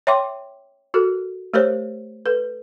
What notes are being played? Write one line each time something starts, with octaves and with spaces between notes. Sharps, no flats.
C#5 E5 G5 C6 D6
F#4 A4 A#4
A3 G4 A#4 C5 C#5
A4 B4